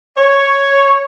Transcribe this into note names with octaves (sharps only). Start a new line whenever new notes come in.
C#5